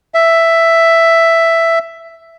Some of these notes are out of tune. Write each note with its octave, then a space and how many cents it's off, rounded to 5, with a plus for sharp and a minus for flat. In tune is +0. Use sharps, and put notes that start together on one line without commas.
E5 +5